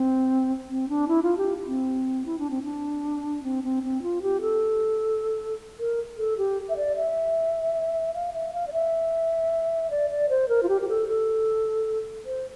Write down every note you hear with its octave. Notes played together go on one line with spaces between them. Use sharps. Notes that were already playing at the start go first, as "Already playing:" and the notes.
Already playing: C4
C4
D4
E4
F4
G4
C4
E4
D4
C4
D4
C4
C4
C4
F4
G4
A4
A#4
A4
G4
E5
D5
E5
F5
E5
F5
D5
E5
D5
D5
C5
A#4
F4
G4
G4
A4
A4
C5